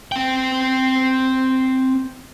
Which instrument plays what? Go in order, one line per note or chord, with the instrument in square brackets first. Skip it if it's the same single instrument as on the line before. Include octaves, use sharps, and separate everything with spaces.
[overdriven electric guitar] C4 G5